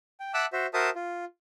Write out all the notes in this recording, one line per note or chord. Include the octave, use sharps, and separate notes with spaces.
G5
E5 F#5 A5 D6 E6 F#6
F#4 C5 E5
F#4 A#4 C5 E5 A5 D#6
F4